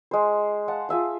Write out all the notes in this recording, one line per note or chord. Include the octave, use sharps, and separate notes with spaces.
G#3 C5
F5 F#5 A5
F4 G#4 E5 F5